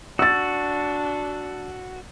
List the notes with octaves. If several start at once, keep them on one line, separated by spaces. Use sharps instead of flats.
D4 F#4 E6 A6